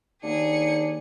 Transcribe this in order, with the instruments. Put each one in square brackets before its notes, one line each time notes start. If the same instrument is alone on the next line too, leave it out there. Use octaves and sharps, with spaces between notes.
[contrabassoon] D#2 [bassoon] D4 [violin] G#4 C#7